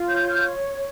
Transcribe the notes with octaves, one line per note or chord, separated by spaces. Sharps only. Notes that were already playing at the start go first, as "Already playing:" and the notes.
Already playing: F4
C#5 G6
F6